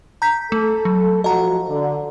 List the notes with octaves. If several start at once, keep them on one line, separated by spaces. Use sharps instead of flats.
A#5 G6 B6
A3 A4
F#3
F3 F#4 D#5 A#5
D3